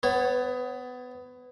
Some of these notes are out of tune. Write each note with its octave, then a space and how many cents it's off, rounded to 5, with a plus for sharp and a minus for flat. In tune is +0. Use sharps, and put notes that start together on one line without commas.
B3 +20 C#5 -20